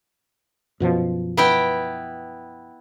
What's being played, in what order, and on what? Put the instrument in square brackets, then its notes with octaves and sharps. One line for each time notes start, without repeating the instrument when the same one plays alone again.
[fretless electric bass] F#2 B2 F3
[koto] B3 E4 G5